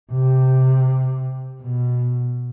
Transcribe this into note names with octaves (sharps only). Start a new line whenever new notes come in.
C3
B2